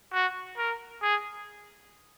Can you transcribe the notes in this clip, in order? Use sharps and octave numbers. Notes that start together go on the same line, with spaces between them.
F#4
A#4
G#4